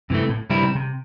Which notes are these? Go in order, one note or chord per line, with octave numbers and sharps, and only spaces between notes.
G2 C3 E3 A3
A2
G2 C3 G3 C4 E4
C3
C3